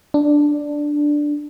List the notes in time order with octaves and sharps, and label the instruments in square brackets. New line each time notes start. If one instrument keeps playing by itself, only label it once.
[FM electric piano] D4